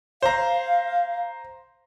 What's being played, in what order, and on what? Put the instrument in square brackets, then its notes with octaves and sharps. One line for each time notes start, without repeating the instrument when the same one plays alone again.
[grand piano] C5 A#5 [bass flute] F5